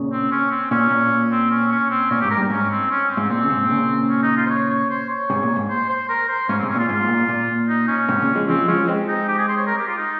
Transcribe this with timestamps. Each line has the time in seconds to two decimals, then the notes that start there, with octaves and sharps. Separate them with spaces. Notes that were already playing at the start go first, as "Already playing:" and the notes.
Already playing: A#2 C#3
0.12 C4
0.32 C#4
0.52 C4
0.71 A#2 C#4
0.91 A#2
1.31 C4
1.51 C#4
1.71 C#4
1.90 C4
2.11 A#2 C#4
2.21 G#2 G4
2.31 A#4
2.37 G2
2.50 G#2 C#4
2.71 C4
2.91 C#4
3.11 C4
3.17 G#2
3.30 A#2 C4
3.43 C#3
3.50 G#2 C3
3.70 A#2 C#3
4.09 C#4
4.23 D#4
4.37 F4
4.46 C5
4.50 C#5
4.70 C#5
4.90 C5
5.10 C#5
5.30 G#2 C3
5.43 A#2
5.56 G#2
5.69 C5
5.89 C5
6.09 A#4
6.29 C5
6.49 G#2 C#4
6.59 G#2 C3 C4
6.69 C#4
6.76 A#2 F4
6.89 G#2 F4
7.04 G#2
7.08 A#2
7.29 A#2
7.69 D#4
7.88 C#4
8.08 G#2 C3
8.22 A#2 C#3
8.35 F3 G#3
8.48 C#3 F3 C4
8.68 F3 G#3 C#4
8.88 G#3 C4
9.08 D#4
9.28 G4
9.38 G#4
9.48 C5
9.57 C#5
9.67 A#4
9.77 G4
9.87 F4
9.98 D#4